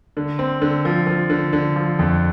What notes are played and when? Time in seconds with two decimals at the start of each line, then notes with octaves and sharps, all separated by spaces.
0.17 D3
0.39 C4
0.62 D3
0.85 F3
1.07 F3
1.30 D3
1.53 D3
1.76 F3
1.99 F2